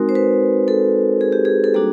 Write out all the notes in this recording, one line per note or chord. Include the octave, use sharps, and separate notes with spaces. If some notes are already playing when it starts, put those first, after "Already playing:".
Already playing: G#3 C4 D#4 F#4 A#4
C5
B4
A4
G#4
G4
G#4
A4
G3 A#3 D4 F#4 G#4